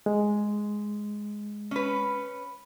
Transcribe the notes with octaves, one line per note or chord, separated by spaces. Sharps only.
G#3
C#4 B4